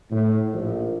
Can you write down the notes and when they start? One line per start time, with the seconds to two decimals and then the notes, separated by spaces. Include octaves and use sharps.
0.11 A2
0.52 A#1